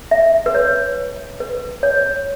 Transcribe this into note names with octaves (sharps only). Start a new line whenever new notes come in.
E5
B4
C#5
B4
C#5